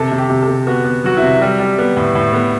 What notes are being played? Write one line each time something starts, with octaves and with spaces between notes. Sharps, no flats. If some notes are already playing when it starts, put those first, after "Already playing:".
Already playing: C3 A4
C3
G4
C3
A4
C3
B3 F#4
B3
F#3 F#4
C3 E4
G3
G3
B3
A2
A2
B3